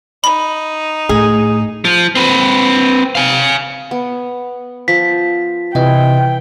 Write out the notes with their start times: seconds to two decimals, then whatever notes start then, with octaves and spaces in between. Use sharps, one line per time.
0.24 D#4 B5
1.09 A2 G#4
1.85 F3
2.15 C4 B4
3.15 F5 G#5
3.91 B3
4.88 F3 B6
5.75 C3 E3 D#5 G5